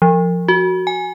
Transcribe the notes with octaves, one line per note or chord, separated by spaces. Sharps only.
F3
F#4
G#5